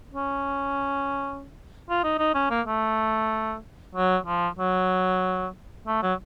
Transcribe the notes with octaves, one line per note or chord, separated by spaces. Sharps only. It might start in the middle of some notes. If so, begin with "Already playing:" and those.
C#4
F4
D#4
D#4
C#4
A#3
A3
F#3
F3
F#3
A3
F#3